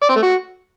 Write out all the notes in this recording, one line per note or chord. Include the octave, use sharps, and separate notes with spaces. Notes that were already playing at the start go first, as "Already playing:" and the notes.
D5
C4
A3
F#4